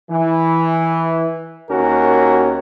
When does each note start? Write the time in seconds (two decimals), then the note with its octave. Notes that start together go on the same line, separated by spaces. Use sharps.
0.10 E3
1.69 D#2 C#4 F#4 A#4